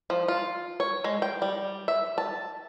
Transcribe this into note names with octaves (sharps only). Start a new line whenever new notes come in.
F3
F4
C#5
G#3
G5
G3
E5
A5